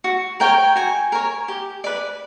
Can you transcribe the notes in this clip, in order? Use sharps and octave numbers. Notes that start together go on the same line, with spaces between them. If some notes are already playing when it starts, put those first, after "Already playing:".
F#4
A#4 C#5 G5
F#4 G#5
A#4 C#5
G4
B4 D5